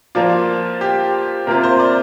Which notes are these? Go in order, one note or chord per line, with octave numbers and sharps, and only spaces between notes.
F3 A#3 F4 D5
G4
C3 A#3 F4 A#4
C5
D5